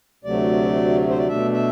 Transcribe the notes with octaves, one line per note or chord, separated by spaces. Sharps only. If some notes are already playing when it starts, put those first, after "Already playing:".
D2 C3 F#3 A3 D5
C5
D5
B2 A3 D4 E5
E5